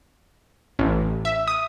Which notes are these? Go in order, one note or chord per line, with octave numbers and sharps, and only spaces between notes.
A1
E5
D#6